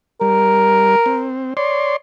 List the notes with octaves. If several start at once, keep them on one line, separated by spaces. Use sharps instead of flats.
G3 A#4
C4
C#5 D5 C6